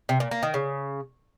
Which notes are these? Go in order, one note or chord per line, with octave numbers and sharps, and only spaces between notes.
C3
A#2
A#3
D#3
C#3